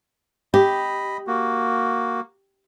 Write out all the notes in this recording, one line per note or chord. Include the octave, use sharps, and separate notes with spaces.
G4 D#5 B5
A#3 F#4